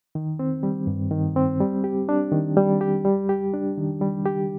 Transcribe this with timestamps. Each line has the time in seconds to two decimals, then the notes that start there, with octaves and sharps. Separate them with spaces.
0.15 D#3
0.39 C4
0.63 G3
0.87 G2
1.11 D#3
1.36 C4
1.60 G3
1.84 G4
2.09 D4
2.32 D#3
2.57 G3
2.81 G4
3.05 G3
3.29 G4
3.54 D4
3.78 D#3
4.01 G3
4.26 G4